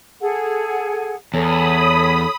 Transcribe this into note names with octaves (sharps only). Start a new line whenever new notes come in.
G#4 A4 F#5
E2 A4 C#5 B5 D#6